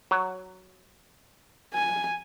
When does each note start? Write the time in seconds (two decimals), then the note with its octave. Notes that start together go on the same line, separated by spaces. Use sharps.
0.11 F#3
1.74 G#5